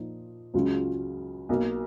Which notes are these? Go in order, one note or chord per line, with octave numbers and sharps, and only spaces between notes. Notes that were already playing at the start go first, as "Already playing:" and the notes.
Already playing: A#2 F3 D#4
C#2 C#3 F#3 C#4 F4
B1 B2 A#3